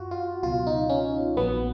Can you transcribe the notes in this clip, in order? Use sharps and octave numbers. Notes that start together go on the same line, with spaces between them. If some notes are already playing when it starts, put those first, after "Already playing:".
Already playing: F#2 F4 F#4
F4
C#2 B2 F#3 F4
D#4
C#4
A#1 A#2 F#3 B3